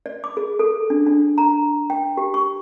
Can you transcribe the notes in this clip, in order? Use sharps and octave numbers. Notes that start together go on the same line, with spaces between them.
D5
D6
G#4
A4
D4
D4
A#5
G5
G4
C#6